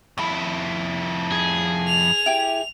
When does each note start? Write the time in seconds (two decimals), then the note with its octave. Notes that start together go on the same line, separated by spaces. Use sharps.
0.18 F2 E4 B5
1.32 G#4
1.87 F7
2.26 E4 G4